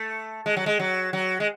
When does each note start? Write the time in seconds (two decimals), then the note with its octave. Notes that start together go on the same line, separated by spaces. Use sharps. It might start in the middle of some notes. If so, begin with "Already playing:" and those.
Already playing: A3
0.46 G#3
0.57 F#3
0.66 G#3
0.80 F#3
1.13 F#3
1.40 G#3